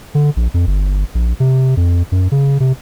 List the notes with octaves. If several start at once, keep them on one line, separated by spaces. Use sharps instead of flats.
D3
A#1
F2
G1
A#1
C3
F2
F#2
C#3
C3